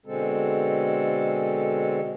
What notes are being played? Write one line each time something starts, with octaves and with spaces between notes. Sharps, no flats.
B2 D3 G#3 C4 A4